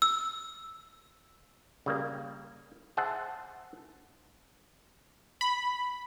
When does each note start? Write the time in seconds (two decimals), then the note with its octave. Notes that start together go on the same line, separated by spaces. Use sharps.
0.02 E6
1.86 C#3 G3 A#3
2.97 G#4 C5 E5 F#5 A5
5.41 B5